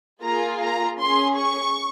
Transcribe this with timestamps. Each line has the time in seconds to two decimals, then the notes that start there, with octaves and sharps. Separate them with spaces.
0.22 A#3 F4 G#4 A#5
0.61 A#5
1.00 C#4 G#4 C6
1.38 C#6